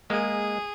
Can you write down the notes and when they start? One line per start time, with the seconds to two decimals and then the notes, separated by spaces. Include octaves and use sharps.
0.10 G#3 A#3 G#4